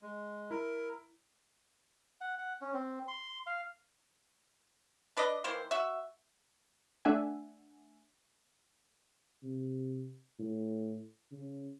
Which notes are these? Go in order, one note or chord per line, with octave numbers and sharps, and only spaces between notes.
G#3
E4 A#4
F#5
F#5
C#4
C4
C6
F5
D4 B4 D5 D#5
D#3 E3 A#3 C5
F#4 E5
A3 D4 E5 F#5 G#5
C3
A2
C#3